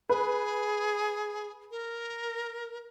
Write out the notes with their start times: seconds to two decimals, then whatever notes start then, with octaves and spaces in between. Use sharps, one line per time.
0.09 G#4 B4
1.71 A#4